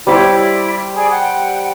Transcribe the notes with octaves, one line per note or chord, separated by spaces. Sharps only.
G3 E4 G4 C5 C#5 D6
E4 D5
G#4 D5
F#5 G5